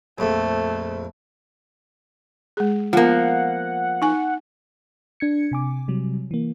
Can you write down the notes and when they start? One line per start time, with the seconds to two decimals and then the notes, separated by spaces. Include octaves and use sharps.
0.18 A#1 F2 A3
2.57 G#3 G#4
2.93 F3 A#3 B3 F4 F#5
4.02 D#4 G#5
5.20 D4 G#6 C#7
5.52 C3 G#5 D6
5.88 C3 F#3 G3
6.31 E3 A#3